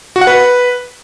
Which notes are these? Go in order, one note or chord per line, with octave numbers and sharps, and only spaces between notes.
F#4
F#5
B4